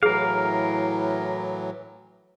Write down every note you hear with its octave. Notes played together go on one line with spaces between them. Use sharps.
A2 E3 F#3 G#4 A#4 F5